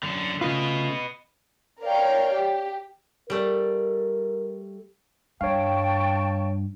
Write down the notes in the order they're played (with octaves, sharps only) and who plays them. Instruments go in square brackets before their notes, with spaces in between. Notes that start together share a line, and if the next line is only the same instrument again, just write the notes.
[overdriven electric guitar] F#2 D3
[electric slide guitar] C#3 A3 F4 [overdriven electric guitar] B4 D#5
[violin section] A#4 C#5 D5 F5 G5
G4
[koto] G3 A3 [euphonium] A#4
[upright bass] G2 [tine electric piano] C#5 F5 [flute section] G5 A5 C#6